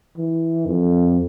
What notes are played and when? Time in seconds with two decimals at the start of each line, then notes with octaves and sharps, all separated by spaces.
0.17 E3
0.66 F2